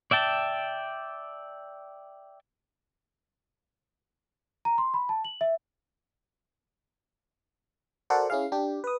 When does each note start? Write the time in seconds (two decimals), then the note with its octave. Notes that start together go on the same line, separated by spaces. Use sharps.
0.11 D5 E5 G5 A5
4.65 A#5
4.78 C6
4.94 B5
5.09 A5
5.25 F#7
5.41 E5
8.10 F#4 A4 A#4 C5 D5 F#5
8.30 C#4 E4 G#4 F5
8.52 D4 G4
8.84 B4 D#6